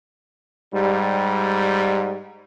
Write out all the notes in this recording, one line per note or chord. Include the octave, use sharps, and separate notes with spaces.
G#2 G3